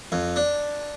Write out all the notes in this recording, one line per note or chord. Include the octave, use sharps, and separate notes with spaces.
F2
D4